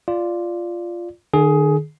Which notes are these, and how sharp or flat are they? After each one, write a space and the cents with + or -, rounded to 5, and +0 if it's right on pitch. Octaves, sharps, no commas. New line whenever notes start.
F4 -5 D5 +0
D#3 -45 G#4 +15